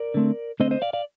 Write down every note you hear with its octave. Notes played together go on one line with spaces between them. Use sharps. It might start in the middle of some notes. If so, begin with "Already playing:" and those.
Already playing: A#4 D5
D3 A3 C4
D3 A3 C4 C5 D#5
C5 D#5
D5 F5
D5 F5